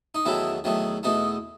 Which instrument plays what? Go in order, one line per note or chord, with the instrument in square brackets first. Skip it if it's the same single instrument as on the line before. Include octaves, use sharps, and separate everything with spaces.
[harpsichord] D#4
E2 D#3 F#3 A3 E4
E2 D#3 F#3 A3
E2 B2 A3 D#4